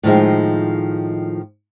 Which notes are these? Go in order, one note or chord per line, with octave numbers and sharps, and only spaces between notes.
A2 D#3 F3 G#3